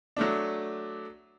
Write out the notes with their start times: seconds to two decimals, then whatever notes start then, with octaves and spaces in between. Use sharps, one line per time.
0.16 F#3 A3 D4